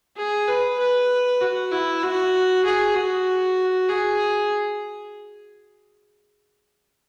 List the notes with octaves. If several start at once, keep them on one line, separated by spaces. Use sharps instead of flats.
G#4
B4
B4
F#4
E4
F#4
G#4
F#4
G#4